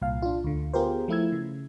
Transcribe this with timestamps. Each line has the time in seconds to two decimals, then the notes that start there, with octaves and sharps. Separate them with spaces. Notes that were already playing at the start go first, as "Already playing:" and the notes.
0.01 C2 A#2 F5
0.22 D4 F4
0.44 D2 D3
0.74 B3 F4 G4 G#4 A#4 C5
1.08 F3 A3 E4 E6 G#6
1.32 C#3